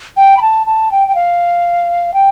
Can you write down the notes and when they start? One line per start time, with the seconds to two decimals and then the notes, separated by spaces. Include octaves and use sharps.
0.17 G5
0.37 B5
0.42 A5
0.67 A5
0.91 G5
1.08 G5
1.15 F5
2.14 G5